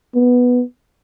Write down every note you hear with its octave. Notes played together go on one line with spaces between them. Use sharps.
B3